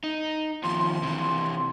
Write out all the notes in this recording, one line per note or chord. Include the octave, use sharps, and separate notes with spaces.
D#4
D#2 F3 C6
C3 E3